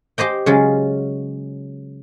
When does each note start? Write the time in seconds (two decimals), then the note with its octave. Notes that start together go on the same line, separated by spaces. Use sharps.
0.18 G4 C5 D#5 G5
0.46 C#3 F#3 G#3 F4